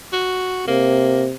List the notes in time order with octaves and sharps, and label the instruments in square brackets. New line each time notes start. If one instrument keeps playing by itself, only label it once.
[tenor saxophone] F#4
[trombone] C3 [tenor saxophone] A#3